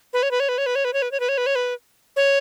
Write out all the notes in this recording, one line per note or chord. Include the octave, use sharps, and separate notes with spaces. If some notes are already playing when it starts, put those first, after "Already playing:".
B4
C#5
B4
C#5
B4
C#5
B4
C#5
B4
C#5
B4
C#5
B4
C#5
B4
C#5
B4
C#5